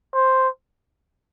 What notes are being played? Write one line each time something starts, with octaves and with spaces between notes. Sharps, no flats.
C5